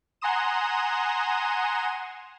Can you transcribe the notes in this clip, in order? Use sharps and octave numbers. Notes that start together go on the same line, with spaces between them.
F#5 G#5 A#5 C6 D#6 E7